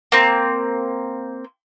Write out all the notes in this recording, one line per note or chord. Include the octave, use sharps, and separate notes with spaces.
A#3 C4